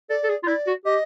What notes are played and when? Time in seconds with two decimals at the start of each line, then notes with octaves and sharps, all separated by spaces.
0.10 A4 D5
0.23 A4
0.28 G#4
0.43 F4
0.47 E4 D5
0.67 F#4
0.85 G4 D#5